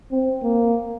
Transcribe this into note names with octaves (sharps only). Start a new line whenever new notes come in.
C4
A#3